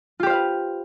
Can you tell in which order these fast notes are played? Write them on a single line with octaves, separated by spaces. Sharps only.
F4 G4 C5 F5 B4